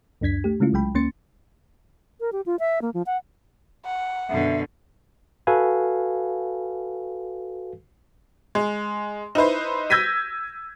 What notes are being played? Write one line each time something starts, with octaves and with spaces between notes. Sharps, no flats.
C#2 F#2 D4 G#6 B6
A3 G4
C#3 G#3 A3 C#4 E4 F4
C2 F#3 G#3 G5 B5
D2 A#3 C#4 C6 A6 C#7
A#4
G4
F4
E5
A#3
F3
F#5
F#5
F#2 B2 D3 E5
F#4 A4 B4 F5 G#5
G#3
D#4 E4 B4 C5
E6 G6 G#6 A#6 B6 D#7